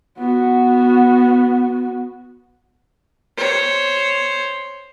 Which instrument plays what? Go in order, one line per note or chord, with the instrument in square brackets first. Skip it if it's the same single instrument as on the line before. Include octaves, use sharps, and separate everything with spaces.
[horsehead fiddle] B3 F#4
[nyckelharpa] C5 C#5